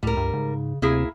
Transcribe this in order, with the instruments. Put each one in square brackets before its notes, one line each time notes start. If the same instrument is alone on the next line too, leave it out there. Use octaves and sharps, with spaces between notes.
[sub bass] C#2 [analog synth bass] A2 [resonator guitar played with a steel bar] G3 A#4
[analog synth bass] G2
[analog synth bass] G#2 [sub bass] C#3
[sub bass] D2 [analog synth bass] C3 [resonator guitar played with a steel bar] A#3 E4 G#4